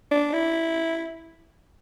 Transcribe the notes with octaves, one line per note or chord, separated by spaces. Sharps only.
D4
E4